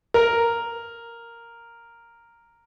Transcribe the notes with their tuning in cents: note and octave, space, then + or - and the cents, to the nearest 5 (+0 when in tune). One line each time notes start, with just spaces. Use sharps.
A#4 -5